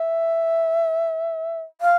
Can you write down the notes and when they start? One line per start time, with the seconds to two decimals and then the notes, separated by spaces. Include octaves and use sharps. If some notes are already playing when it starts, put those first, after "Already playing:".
Already playing: E5
1.81 F5